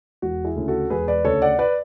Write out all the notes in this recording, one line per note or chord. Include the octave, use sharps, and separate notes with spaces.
E1 F#4
E4 G#4
D2 C#3
F#4 A4
E1 G#4 B4
B4 D5
D2 C#3 A4 C#5
D5 F#5
B4 D5